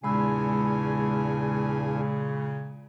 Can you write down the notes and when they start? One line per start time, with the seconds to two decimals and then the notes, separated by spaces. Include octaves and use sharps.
0.04 E2 A#2 C#3 G#3 D4 G#5 B5 E6